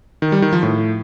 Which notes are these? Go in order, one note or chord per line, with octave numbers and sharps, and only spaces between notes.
D#3
G3
D#3
F3
A2